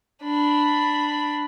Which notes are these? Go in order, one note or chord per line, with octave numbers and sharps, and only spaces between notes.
D4 B5